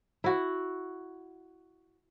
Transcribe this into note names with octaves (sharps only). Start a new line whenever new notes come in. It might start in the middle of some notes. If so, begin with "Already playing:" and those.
E4 F#4